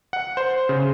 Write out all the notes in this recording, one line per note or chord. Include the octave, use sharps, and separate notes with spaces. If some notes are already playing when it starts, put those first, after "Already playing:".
F#5
C5
C#3